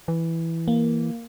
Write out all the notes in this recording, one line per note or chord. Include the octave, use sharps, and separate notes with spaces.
E3
A#3